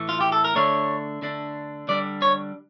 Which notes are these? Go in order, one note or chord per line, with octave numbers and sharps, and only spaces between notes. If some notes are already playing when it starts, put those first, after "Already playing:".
Already playing: A2 E3 A3
F4
G4
A4
A#4
D3 A3 D4 C#5
D3 A3 D4
D3 G3 D4 D5
C#5